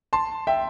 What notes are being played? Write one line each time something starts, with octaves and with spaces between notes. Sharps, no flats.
A5 C6
E5 G5